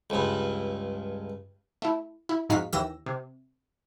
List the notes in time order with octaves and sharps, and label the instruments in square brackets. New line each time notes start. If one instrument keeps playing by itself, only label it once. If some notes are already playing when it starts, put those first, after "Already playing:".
[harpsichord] C#2 G2
[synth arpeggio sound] A3 E4
E4
F2 G#2 D#4 F#4 F5 B6
D#2 E3 G4 E6 A#6
C3